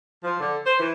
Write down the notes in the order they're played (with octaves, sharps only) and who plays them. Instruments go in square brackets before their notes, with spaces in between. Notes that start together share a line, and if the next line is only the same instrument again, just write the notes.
[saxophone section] F3
D3
C5
E3